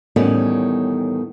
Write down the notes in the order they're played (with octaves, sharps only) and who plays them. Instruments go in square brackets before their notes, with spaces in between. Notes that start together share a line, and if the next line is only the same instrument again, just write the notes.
[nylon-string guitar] E2 A2 D#3 G3 B3 C#4